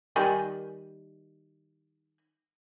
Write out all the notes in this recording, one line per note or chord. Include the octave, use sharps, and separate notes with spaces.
D#3 G3 G#5